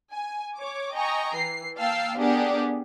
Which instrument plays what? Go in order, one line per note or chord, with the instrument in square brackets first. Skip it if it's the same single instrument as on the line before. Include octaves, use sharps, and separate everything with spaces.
[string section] G#5
C#5 D6
D#5 G5 G#5 A#5 C#6
E3 C7
A#3 F5 G5 A5 E6 C7
B3 D4 G4 G#4 A#4 F#5